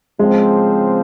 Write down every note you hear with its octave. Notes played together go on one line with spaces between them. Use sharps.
C#3 F3 G#3 C4